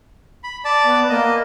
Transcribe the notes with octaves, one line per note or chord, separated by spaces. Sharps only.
B5
D5 A5
B3
A#3 D#5